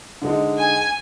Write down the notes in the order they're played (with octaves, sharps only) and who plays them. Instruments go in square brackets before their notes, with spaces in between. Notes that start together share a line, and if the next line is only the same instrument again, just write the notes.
[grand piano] D3 G#3 D#4
[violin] G#5